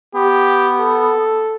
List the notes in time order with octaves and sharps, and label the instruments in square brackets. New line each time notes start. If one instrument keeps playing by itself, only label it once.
[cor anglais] B3 [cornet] G4
[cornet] A4